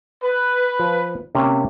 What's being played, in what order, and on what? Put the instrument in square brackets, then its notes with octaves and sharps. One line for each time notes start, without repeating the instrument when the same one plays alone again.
[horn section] B4
[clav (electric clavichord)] F3
C3 A#3 C#4